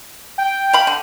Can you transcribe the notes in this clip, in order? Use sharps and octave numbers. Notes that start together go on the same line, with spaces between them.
G5
F5 B5
D3